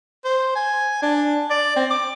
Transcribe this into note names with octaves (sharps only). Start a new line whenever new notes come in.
C5
G#5
D4
D5
C4
D6